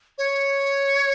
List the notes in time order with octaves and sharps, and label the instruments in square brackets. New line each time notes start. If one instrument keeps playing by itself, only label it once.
[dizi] C#5